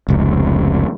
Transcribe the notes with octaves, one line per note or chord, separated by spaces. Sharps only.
F1 C#2